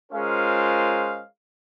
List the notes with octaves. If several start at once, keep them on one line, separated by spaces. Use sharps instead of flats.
G#3 C#4 F4 A#4 C5 F5